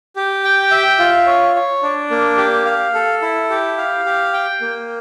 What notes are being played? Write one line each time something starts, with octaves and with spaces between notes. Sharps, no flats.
G4
G5
E5
F4
C#5
C#5
D4
A#3
G4
F5
A4
E4
G4
F5
G4
G5
A#3